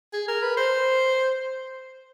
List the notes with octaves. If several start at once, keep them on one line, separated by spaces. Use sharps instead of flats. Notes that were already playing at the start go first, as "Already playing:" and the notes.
G#4
A#4
B4
C5